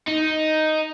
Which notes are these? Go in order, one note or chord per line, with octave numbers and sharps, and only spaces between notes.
D#4